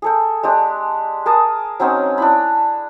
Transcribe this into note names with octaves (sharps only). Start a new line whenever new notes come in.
G#4 A4 G5
G#3 D4 G4
G#4 A#4 A5 D#6
F#3 C4 C#4 D#4
D4 E4 B5